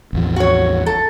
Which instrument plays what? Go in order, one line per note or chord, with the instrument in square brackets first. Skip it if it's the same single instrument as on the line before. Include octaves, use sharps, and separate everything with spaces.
[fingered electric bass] A1 E2 F3
[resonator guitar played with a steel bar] F#4 C#5
A4